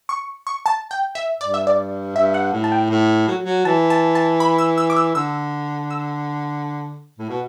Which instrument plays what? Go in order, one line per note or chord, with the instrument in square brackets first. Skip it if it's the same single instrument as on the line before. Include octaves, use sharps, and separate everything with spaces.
[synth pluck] C#6
C#6
A5
G5
E5
[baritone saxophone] G2 [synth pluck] D5
[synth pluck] E5
D5
[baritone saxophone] G2 [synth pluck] E5
[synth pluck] F#5
[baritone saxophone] A2
[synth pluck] A5
G5
[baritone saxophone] A2
F#3
F#3
[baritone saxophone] E3 [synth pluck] A5
[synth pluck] A5
A5
B5
E6
E6
D6
E6
[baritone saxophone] D3 [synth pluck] E6
[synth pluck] E6
[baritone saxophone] A2
B2